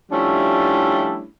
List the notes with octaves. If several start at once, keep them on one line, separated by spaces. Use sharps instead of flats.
F3 G3 A3 C#4 D4 E4